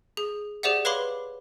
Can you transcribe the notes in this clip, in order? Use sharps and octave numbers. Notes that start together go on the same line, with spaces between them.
G#4
G4 G#4 C5 D5 E5 F#5
B4 C#5 F5 B5 C6 D6